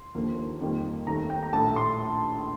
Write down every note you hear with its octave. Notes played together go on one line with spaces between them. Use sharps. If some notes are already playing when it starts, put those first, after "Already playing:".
Already playing: C6
D#2 D3 F3 A#3
F2 D#3 G3 A#3
D#2 D#3 A3 A#5
G5
A#5
A#1 A2 A3 A5
C6